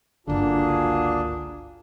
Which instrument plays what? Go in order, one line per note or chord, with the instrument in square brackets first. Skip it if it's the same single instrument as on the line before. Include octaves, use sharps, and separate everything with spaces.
[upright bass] G1 C#2 [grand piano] D3 [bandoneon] A#3 D4 [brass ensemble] F4 F#4 G#4